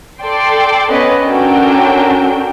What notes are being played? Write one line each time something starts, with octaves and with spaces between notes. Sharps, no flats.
A4 D5 G5 C6
B3 C#4 B4 D#5
C#4 D4 F#4 A4 A#4 G5